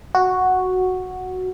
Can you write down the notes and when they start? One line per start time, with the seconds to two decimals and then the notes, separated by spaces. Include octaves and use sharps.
0.15 F#4